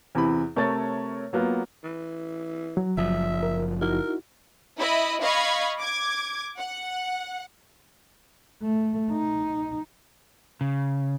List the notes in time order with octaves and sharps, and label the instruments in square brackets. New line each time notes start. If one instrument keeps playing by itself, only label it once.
[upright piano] E2 C3 E3 B5
C3 A3 A#4 C#5 C#6 A6
F#3 A#3 B3 F4
[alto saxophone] E3
[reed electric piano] F#3
[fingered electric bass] F#1 F3 [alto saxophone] E5
[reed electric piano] A#4
[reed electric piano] D#4 E4 F#4 [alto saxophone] A#4
[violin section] E4 D#5 E5 B5
D#5 F5 B5 C#6 G#6
D6 G#6
F#5
[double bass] A3
D#4
[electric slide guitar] C#3